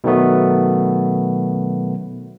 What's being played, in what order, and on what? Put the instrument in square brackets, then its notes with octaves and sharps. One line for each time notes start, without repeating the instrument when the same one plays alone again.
[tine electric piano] B2 D#3 F#3 A3 B3